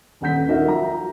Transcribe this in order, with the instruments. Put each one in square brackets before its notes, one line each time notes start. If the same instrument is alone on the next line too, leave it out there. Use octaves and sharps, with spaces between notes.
[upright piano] D#1 G2 F#5 G6 B6
D#4 F#4 A#4 E5
F3 F#4 A#5